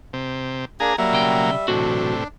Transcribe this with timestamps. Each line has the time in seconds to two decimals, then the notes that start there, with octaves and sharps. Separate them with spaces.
0.13 C3
0.80 A#3 D4 G#4 A#5
0.98 F#3 G3 A#3 E5
1.11 B1 C#3 G5
1.68 B1 E2 A2 C3 D4 F#4